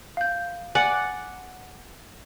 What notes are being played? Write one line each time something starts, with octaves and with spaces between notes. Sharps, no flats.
F5 G6
D5 F#5 G#5 C#7